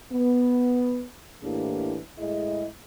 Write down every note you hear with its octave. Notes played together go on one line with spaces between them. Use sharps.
B3
A2 E3 A#3 D4 G4
A2 G#3 E4 G#4 D#5